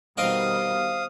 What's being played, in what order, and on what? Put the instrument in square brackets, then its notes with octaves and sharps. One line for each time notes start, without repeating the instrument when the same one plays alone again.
[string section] B2 D#3 G3 [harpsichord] C4 D#5 G5 [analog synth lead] F5 [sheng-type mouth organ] D#6